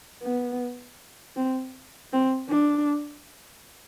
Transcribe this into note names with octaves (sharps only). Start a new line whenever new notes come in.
B3
C4
C4
D4